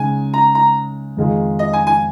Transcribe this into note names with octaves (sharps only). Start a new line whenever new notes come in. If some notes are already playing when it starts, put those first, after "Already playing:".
Already playing: C#3 G#3 D#4 G#4 G#5
A#5
A#5
F2 D#3 G#3 F4 G#4
D#5
G#5
G#5